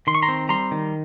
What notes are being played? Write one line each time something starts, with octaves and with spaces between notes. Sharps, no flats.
D#3 C6
C#6
A#5 C6
C4
G3 A#5 C6
D#3